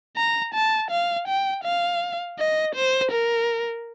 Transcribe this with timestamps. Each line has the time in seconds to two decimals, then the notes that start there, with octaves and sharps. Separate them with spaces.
0.17 A#5
0.54 A5
0.91 F5
1.28 G5
1.64 F5
2.39 D#5
2.76 C5
3.12 A#4